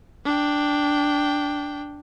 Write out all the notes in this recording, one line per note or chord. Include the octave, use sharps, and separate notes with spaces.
D4 G5